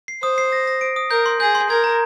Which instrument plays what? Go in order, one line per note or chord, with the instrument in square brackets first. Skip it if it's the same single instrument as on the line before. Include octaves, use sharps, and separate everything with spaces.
[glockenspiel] C7
[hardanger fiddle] C5 [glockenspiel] D#6
[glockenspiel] C7
A#6
A#6
D7
D#6
[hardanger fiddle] A#4 [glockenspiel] G6
[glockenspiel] C6
[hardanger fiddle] G#4 [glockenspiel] G6
[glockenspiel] C6
[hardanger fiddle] A#4 [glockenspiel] G#6
[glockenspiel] A#5